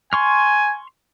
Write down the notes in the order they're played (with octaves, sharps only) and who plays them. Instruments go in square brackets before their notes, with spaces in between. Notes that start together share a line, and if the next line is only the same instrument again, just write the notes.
[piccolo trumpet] G#5 [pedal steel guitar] C6 C#6 F6